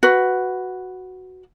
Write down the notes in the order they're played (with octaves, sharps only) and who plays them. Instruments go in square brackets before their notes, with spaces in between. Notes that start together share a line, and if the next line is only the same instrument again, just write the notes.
[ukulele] F#4 B4